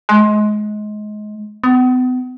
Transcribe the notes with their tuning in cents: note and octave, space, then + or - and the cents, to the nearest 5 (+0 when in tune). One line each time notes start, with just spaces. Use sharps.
G#3 +25
B3 +40